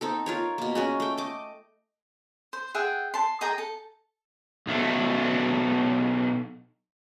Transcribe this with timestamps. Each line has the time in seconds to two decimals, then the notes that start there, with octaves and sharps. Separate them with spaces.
0.01 C4 D#4 A4
0.26 F4 A#4 C#5
0.58 B2 A#3
0.75 G#3 C#4 F#4
1.00 A3 G5
1.17 D#5 D6
2.53 C5
2.75 G#4 E5 F#5 G5
3.14 A5 C6
3.41 G#4 D#5 G5 A#5
3.58 A4 A5
4.67 B1 A3